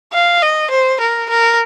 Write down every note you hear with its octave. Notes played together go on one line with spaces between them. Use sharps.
F5
D#5
C5
A#4
A#4